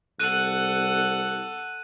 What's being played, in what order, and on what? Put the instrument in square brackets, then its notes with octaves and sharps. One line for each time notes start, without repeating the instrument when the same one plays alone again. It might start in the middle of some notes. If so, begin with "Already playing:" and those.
[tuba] C2 [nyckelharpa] A4 F#5 [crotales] F#6 D#7